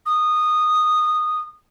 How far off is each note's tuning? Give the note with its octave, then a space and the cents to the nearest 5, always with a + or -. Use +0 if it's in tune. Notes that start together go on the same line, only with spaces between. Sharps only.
D#6 -15